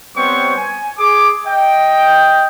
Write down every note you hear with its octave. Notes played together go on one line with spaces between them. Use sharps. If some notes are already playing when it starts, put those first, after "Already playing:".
G3 B3 C4 C5 C#5 C#6
G#5
G#4 D6
D#5 G5